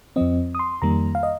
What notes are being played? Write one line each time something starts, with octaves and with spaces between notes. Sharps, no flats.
F2 F3 C4 D#5
D#6
C6
F2 D#3 G3 A#3 A#5
F5
D#5